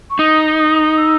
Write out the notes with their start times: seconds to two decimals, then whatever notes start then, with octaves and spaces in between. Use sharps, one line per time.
0.11 C#6
0.19 D#4 D#6
0.59 D#6
0.98 E6